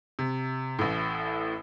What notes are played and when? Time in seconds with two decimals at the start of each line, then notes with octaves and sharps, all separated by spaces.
0.19 C3
0.79 A1 A2